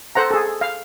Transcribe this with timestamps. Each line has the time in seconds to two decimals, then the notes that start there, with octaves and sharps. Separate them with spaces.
0.15 A4 C5 F#5 A#5
0.31 G#4 A4
0.61 F5